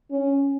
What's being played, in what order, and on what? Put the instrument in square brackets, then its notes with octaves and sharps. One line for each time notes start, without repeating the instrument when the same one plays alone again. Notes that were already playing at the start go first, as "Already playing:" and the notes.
[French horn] C#4